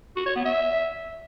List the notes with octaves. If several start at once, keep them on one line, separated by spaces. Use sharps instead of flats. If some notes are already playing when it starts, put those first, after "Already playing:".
F#4
C#5
B3
E5